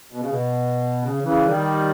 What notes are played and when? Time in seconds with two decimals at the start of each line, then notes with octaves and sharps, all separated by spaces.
0.13 B2
0.22 C#3
0.29 B2
1.02 C#3
1.23 C#3 E3
1.46 D#3 G3